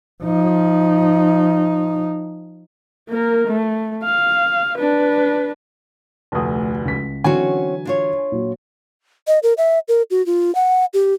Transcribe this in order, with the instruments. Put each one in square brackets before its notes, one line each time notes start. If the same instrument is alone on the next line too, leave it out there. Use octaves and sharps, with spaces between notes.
[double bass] F3 D#4
[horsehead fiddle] A#3 A#4
A3
F5
D4 B4
[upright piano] F1 D2 [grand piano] A5 D#6
[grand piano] C#2 B6
[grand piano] D3 E3 F#3 [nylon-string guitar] C4 C#4 F#4 [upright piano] G#5
[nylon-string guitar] D4 F4 C#5
[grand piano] A#2 F#3
[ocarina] D#5
A#4
E5
A#4
F#4
F4
F#5
G4